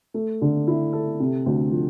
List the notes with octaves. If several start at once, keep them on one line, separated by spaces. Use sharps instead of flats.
A3
D3
E4
A4
C3
D2
F3